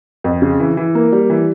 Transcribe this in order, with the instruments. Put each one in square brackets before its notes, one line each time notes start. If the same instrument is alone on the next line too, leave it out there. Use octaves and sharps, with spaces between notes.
[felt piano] F2
C#3
E3
E3
A#3
G3
E3